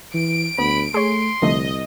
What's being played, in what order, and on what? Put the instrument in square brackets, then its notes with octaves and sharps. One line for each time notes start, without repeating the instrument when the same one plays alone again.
[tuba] E3 [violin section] D7
[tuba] D2 [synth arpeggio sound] B3 [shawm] B5
[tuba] A3 [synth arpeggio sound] G#4 C#5 [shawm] C6
[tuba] C2 [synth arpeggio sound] D3 F3 A3 [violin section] D#5